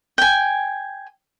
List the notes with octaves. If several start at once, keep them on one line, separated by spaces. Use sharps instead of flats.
G5 G#5